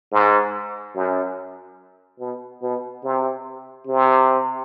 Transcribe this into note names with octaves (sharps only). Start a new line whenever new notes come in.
G#2
F#2
B2
B2
C3
C3